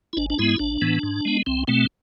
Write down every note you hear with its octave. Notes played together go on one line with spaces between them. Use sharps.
E4
G#1 D4
D4
G#2 G#3 B3 E4
A1 D4
A2 E3 B3
G#2
G#3 B3
C2 C4
B2 A3 C4